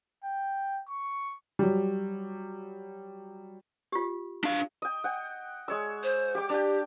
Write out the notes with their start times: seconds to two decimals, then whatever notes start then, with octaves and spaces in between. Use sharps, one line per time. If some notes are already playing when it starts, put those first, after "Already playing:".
0.24 G5
0.89 C#6
1.59 F#3 G3
3.92 F4 G4
4.44 D4 F5
4.82 D#5 G5
5.04 F#5 G5
5.68 G#3 C#5 E6
6.04 C5
6.35 G4 G5 D6
6.49 D4 G4 G5